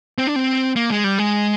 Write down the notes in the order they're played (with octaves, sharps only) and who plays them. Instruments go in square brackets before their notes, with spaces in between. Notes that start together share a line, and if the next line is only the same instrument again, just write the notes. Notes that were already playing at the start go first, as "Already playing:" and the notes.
[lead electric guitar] C4
D4
C4
A#3
G#3
G3
G#3